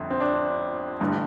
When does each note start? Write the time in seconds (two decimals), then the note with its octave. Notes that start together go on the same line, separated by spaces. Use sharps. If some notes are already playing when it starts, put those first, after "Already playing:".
Already playing: G1 F2 D3
0.10 C4
0.20 D4
1.00 A1 G2 D3